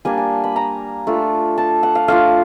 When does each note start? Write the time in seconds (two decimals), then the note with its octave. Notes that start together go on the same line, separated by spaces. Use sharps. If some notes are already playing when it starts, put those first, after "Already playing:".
0.05 G3 A#3 D4 G#5
0.17 G#5
0.44 B5
0.56 A#5
1.07 A3 D4 F4
1.58 A5
1.83 F#5
1.95 F5
2.08 A3 D4 F4 F5